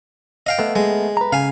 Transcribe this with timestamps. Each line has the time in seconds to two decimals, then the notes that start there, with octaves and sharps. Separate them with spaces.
0.46 D#5 F5 G5
0.59 A3 B3
0.76 G#3
1.17 B4 A#5
1.33 C#3 F5 G#5